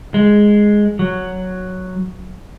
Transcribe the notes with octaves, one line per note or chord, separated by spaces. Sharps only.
G#3
F#3